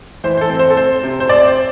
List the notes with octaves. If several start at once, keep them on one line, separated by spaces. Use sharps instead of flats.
E3 C5
C5
A4
C4
C5
A4
C4 C5
C3
C5
C4 D5
C5